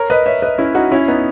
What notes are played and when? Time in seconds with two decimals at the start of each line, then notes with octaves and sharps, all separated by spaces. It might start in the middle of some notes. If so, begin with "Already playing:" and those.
Already playing: A#4 C#5
0.10 B4 D#5
0.26 C#5 E5
0.42 B4 D#5
0.58 C#4 E4
0.75 D#4 F#4
0.92 C#4 E4
1.08 B3 D#4